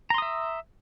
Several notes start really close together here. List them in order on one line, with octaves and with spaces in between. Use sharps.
A#5 C6 D#6 E5